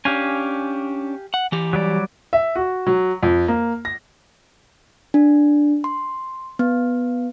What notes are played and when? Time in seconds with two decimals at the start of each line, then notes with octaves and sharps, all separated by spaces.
0.05 C#4 D4 G4 F5 G#5
1.34 F#5
1.52 E3 G4
1.73 F#3 G3 D5
2.33 E5
2.56 F#4
2.87 F#3
3.23 F2
3.48 A#3
3.85 A#6
5.14 D4
5.84 C6
6.59 B3